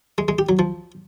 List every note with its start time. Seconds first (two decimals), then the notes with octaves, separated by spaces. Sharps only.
0.18 G#3
0.28 G#3
0.39 G4
0.49 F#3
0.59 F3